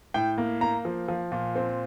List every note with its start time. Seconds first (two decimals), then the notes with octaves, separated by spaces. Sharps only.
0.14 A2 G5
0.38 A#3
0.61 A#3 A#5
0.85 F3
1.08 F3
1.32 A#2
1.55 C4